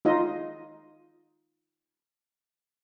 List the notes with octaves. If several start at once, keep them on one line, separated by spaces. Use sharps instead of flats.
D#4 F4 D#5